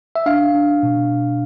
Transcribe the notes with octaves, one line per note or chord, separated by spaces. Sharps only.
E5
D4 F5
D4
B2